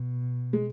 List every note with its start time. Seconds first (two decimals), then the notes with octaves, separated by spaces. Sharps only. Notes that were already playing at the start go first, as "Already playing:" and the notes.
Already playing: B2
0.53 G#3